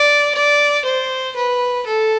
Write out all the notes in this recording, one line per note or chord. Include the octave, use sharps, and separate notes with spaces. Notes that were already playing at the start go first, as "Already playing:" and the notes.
Already playing: D5
D5
C5
B4
A4